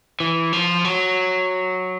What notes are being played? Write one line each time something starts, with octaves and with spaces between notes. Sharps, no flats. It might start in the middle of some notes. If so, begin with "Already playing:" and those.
E3
F3
F#3